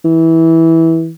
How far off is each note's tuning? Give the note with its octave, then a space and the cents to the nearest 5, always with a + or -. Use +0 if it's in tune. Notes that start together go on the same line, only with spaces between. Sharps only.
E3 -15